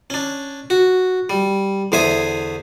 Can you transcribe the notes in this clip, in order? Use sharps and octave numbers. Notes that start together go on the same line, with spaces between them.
C#4 D4
F#4
G3
E2 D3 C5 E5 G#5 D#6